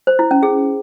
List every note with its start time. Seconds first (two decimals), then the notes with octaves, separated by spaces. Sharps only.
0.07 C5
0.19 E4
0.31 C#4
0.43 G#4